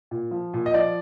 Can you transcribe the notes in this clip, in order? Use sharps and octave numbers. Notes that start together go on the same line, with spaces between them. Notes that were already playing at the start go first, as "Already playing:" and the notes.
A#2
F3
A#2
D#5
F3 D5